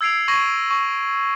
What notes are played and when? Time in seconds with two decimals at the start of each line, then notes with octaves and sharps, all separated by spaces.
0.01 E6 G#6 C7 D7 F7
0.28 C#6 G#6 A#6 D#7 F#7
0.71 C#6